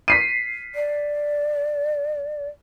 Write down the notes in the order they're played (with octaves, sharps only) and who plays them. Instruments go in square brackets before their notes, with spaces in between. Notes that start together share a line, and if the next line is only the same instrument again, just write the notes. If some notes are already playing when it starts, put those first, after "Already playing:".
[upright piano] B6 C7 D#7
[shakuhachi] D5